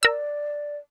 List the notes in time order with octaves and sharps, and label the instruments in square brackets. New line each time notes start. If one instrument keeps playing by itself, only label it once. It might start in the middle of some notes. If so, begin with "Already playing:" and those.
[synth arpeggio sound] A#4 E6 [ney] D5